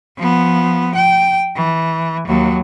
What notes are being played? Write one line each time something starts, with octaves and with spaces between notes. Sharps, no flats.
F3 B3
G5
E3
D#2 F#3